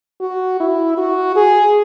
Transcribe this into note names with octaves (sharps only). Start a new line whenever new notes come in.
F#4
E4
F#4
G#4